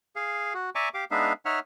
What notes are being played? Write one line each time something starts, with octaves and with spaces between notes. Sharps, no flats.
G#4 F5
F#4
D5 E5 G#5 A#5 C#6 D6
G4 F5 D6
G#3 B3 D4 D#4 E5 F5
D#4 C#5 E5 F#5 F6